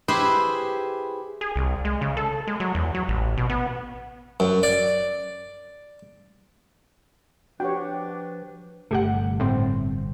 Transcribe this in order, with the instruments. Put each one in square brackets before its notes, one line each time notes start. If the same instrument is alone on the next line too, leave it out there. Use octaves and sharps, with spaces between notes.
[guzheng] E4 G4 G#4 B4 C5 E5
[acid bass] G#4
C2
G#3
C#3
A4
G#3
F#3
E2
F#3
A1
B2
B3
[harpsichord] F#2
D5
[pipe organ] F3 B4 [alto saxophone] D4 [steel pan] F#4 G4 C#5 [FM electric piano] G5
[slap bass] G1 G2 C3 [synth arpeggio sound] A3 G4 F#5
[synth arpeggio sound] A2 C4